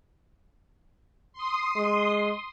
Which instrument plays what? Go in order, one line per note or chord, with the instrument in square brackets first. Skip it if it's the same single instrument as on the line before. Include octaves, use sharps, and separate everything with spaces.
[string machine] C6 D#6
[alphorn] G#3